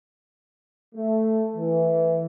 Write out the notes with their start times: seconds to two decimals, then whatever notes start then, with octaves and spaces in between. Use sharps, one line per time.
0.95 A3
1.55 E3